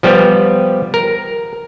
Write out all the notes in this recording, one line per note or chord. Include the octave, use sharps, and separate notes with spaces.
F3 G3 B3 G4
A#4